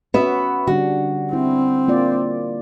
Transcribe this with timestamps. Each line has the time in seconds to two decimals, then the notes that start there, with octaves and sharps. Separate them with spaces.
0.14 B3 C#4 F#4 B4 E5
0.67 D3 G3 D4 F#4
1.33 C4 E4
1.88 A#3 F4 D5